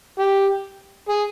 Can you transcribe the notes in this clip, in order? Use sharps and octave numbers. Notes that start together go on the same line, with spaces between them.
G4
G#4